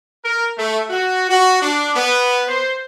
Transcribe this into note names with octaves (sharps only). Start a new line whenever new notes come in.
A#4
A3
F#4
F#4
D4
B3
C5